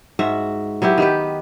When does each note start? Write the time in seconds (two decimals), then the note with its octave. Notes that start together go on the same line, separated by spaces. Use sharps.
0.19 G#2 F#4 E5
0.82 F#3 B3 E4 G4
0.98 D#3 G4 B4